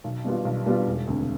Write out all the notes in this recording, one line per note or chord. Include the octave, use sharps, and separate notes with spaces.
B1
B2 G3 B3 F4
B1
B2 G3 B3 F4
E1
D2 C3